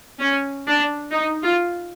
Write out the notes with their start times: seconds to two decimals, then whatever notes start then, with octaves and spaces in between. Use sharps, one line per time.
0.20 C#4
0.67 D4
1.12 D#4
1.44 F4